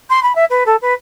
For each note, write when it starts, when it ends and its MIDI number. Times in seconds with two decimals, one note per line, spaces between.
0.10 0.23 84
0.23 0.35 83
0.35 0.45 76
0.50 0.64 71
0.66 0.76 69
0.82 0.94 71